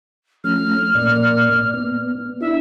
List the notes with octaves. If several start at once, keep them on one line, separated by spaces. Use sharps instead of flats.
F3 A3 C#4 F6
A#2 A#3 D5
B3
D4 E4 E5